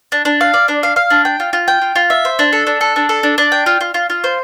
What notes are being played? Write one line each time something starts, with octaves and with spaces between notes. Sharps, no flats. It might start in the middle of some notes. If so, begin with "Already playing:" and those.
D4
D4
F5
D5
D4
F5
F5
D4
G5
F4
F4
G5
F4
F4
E5
C5
D4
A4
D4
A4
D4
A4
D4
D4
G5
F4
F4
F4
F4
C5